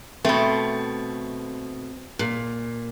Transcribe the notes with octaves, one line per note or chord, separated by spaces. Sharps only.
B2 A3 C4
A#2